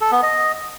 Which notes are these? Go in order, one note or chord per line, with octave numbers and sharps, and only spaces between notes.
A4
B3
D#5